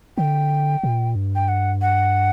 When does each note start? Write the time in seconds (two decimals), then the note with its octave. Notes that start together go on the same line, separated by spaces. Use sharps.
0.17 D3 G5
0.83 A#2
1.15 G2
1.35 G5
1.48 F#5
1.81 F#5